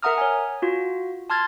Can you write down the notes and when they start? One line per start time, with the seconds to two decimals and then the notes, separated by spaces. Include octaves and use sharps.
0.03 A#4 E5 F#5 A#5 D#6 F6
0.18 C#5 G#5
0.62 F4 F#4
1.30 A5 C6 F6 G#6 A6